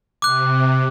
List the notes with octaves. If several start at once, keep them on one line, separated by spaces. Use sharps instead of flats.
C3 D6 F#6